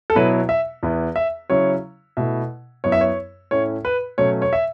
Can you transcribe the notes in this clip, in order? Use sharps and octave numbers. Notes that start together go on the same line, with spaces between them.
A4
B2 F#3 B3 E4 B4
E5
E2 E3 B3 E4
E5
C#3 F#3 C#4 E4 C#5
B2 A3 E4 E5
F#2 F#3 B3 E4 C#5
E5
C#5
A2 A3 C#4 E4 C#5
B4
B2 F#3 A3 C#4 C#5
C#5
E5